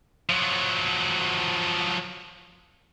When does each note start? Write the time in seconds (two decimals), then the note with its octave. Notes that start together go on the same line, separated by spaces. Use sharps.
0.30 F3 F#3